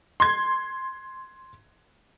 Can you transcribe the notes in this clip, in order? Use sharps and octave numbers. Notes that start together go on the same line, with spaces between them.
C6 G#6